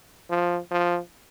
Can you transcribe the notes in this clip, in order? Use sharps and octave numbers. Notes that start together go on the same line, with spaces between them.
F3
F3